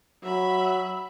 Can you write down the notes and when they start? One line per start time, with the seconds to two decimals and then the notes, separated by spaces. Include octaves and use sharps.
0.24 F#3 E5 B5